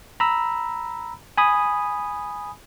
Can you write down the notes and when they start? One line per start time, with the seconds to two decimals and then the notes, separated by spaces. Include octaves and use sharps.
0.20 A#5 B5 E6
1.38 G#5 B5 D#6